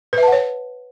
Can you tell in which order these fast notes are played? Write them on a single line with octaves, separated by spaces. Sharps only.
B4 E5 A5 F#5 C#5